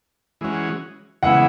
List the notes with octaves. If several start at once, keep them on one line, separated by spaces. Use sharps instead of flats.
E3 G#3 C#4 F#4
C#3 E3 G#3 B3 E4 F#5